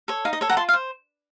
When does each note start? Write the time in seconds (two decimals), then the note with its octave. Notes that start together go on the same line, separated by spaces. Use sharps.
0.08 A4 C#5
0.25 D#4 F5
0.33 D#5
0.41 A4 C#5
0.50 F#5 A#5
0.57 F4 A5 C6
0.69 F5
0.73 C5